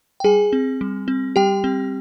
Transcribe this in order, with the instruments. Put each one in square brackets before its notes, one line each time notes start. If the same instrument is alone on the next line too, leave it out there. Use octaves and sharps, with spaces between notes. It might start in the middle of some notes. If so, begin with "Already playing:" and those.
[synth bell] G5
G3 G#4 G#5
C4
G3
C4
G3 G4 G5
C4